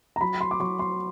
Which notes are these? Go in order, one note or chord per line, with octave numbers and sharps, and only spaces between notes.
A#5
F#3 B5
C6
D6
F#3 C#6
C6